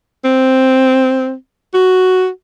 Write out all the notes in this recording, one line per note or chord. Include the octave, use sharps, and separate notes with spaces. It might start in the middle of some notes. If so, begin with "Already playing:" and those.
C4
F#4